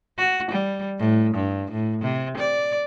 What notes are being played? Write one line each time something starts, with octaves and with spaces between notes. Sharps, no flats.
F#4
G3
A2
G2
A2
C3
D5